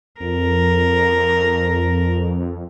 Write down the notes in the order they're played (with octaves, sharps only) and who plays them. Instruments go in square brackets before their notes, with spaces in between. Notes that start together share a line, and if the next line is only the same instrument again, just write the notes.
[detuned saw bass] F2 [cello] A#4